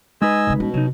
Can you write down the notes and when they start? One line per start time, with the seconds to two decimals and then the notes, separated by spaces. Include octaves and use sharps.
0.22 G#3 D#4 B4 D#5 G#5 E6
0.47 C2 D3
0.60 B2 C#4
0.74 C3 F#3 D#4